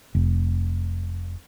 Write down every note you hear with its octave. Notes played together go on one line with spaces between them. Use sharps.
F1